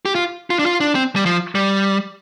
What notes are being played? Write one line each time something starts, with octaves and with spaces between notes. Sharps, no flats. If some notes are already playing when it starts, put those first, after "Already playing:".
G4
F4
F4
D4
F4
D4
C4
G3
F3
G3